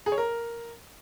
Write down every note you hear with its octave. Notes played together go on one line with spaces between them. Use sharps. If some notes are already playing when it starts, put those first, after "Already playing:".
G#4
C#5
A#4